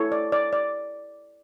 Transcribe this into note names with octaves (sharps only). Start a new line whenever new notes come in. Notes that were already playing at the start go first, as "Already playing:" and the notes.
Already playing: E4 A4 C#5
D5
D5
D5